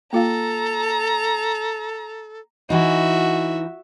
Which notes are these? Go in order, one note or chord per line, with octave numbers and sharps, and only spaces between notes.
A#3 F4 A4 F5 A#5
E3 D#4 F#4 E5